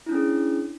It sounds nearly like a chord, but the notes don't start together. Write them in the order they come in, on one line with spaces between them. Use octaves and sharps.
E4 D4 C#4 G#4